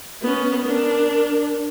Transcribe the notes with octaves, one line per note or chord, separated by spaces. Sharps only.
B3 C#4
D4 A#4